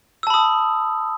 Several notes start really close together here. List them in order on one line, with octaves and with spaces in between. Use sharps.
E6 A5 B5 D#6